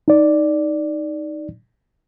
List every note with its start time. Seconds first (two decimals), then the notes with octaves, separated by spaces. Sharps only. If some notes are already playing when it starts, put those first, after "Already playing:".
0.08 D#4 D5